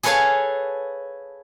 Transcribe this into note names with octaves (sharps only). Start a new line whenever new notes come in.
G#4 A4 B4 C#5 F5 A5